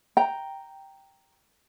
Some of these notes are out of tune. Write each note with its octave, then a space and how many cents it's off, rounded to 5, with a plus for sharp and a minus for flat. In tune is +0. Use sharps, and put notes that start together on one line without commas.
G5 +0 A#5 +0